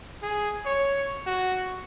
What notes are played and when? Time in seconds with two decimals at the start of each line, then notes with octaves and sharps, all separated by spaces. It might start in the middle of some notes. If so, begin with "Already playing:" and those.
0.23 G#4
0.66 C#5
1.27 F#4